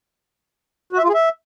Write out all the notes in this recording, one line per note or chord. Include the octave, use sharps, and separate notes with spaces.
F#4
E5
F4
G#4
E5